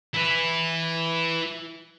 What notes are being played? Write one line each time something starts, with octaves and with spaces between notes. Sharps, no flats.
E4 B4